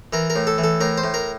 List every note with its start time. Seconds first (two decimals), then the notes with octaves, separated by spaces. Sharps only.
0.13 E3 A#4
0.30 A#4
0.36 A2
0.47 A4
0.58 E3
0.64 A4
0.81 A2 A#4
0.98 C5
1.04 A2
1.14 A#4